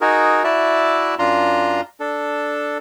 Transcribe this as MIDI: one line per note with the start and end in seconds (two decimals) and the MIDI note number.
0.01 0.43 63
0.01 0.43 66
0.01 0.43 68
0.01 0.43 70
0.44 1.15 64
0.44 1.15 66
0.44 1.15 74
0.44 1.15 76
0.44 1.15 81
1.19 1.81 42
1.19 1.81 62
1.19 1.81 65
1.19 1.81 82
1.19 1.81 84
2.00 2.78 62
2.00 2.78 69